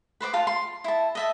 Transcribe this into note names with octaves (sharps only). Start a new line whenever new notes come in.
B4 C5 D5 D6
F4 F5 A5 C6
C6
E4 A5
D#5 E5 A5